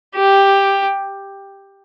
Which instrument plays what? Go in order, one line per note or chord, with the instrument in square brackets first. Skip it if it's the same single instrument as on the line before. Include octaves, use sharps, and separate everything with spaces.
[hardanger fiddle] G4